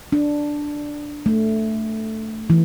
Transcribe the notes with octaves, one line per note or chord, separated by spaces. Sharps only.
D4
A3
E3